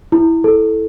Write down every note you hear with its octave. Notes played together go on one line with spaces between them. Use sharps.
E4
A4